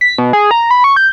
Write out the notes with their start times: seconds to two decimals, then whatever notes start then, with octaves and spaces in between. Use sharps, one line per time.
0.01 B6
0.18 B2
0.33 G#4
0.51 A#5
0.71 B5
0.84 C#6
0.96 G6